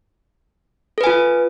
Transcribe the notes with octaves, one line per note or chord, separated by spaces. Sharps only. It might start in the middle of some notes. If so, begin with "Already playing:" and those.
F4 A4 B4 G#5